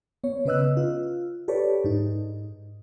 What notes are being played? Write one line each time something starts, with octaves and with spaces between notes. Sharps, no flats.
B3 C#5
C#3 C#4 B4 D#5 E6 F#6
F4
G4 A4 B4 C#5 D5
G#2 D#4